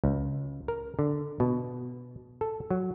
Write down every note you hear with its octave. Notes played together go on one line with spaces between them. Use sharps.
C#2
A#4
D3
B2
A4
F#3